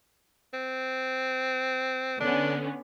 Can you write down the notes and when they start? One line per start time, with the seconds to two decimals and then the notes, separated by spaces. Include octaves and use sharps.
0.53 C4
2.20 D3 B3 C#4 D4